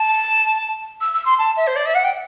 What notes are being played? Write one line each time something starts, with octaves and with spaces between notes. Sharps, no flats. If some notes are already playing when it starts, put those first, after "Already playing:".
Already playing: A5
E6
E6
C6
A5
E5
C5
D5
E5
F#5
G5